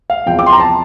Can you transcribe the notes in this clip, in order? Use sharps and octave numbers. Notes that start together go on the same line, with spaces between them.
F5
E2 C3 F3 G5
D6
C6
A#5
A5